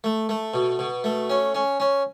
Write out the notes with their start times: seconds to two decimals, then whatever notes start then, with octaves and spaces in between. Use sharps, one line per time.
0.04 A3
0.29 A3
0.54 B2
0.79 B2
1.04 A3
1.30 C#4
1.55 C#4
1.80 C#4